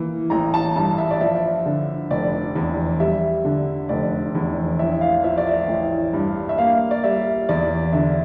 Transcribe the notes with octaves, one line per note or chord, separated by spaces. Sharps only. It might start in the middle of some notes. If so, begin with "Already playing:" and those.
Already playing: E3 A#3
A1 A#5
A5
G2 A5
E5
D5
F3 E5
D3
F1 D5
E2
G3 E5
D3
F1 D5
E2
A1 E5
F5
F3 E5
D5
E5
A1
G2
E5
A#3 F5
D5
G3 E5
E2 D5
D3 E5